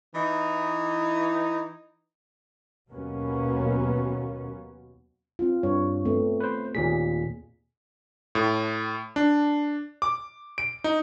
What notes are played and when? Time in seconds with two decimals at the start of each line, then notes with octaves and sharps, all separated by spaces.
0.15 E3 D#4
2.90 D#2 B2 F#3 A#3 B3 C#4
5.39 C4 F4
5.63 G2 C#5
6.05 A3 B3 C4
6.40 B4 C5
6.75 D#2 A#2 G#4 B6
8.35 A2
9.16 D4
10.02 D6
10.58 D7
10.84 D#4